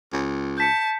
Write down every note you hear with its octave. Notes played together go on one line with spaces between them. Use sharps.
C#2
A5 G6 B6 C#7